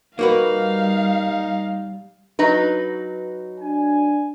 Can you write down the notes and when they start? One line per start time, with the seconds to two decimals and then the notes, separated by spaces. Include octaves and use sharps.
0.19 G3 A#3 D#4 F#4 B4 F5
2.39 F#3 D#4 B4
3.61 D4 G#5